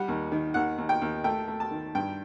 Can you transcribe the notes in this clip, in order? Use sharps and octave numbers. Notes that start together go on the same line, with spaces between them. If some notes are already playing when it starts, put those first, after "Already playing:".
Already playing: G3 F#5
D#2
D#3
D#2 F#5
D#2
G5
D#2
A3 G5
A3
A5
D#3
G2 G5